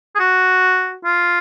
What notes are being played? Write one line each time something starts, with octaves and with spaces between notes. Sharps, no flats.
G#4
F#4
F4